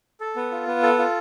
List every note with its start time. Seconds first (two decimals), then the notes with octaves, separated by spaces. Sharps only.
0.20 A4
0.36 B3
0.52 F4
0.67 B3
0.83 A4
0.98 F4